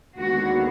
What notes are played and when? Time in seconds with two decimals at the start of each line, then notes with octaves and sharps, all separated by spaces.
0.19 D#2 D3 G#3 B3 F#4